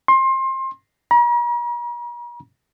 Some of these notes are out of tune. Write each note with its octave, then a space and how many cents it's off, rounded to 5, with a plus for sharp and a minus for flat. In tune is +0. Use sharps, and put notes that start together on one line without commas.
C6 +25
A#5 +45